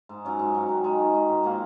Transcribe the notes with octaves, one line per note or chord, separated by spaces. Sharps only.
G#2
F#3 C#4
G#2
F#3 C#4
D#3
G#3 D#4
D#3
G#3 D#4
G#2
F#3 A#3 F4